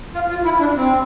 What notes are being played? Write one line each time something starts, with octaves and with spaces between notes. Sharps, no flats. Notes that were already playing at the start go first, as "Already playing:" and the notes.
F4
F4
E4
D4
C4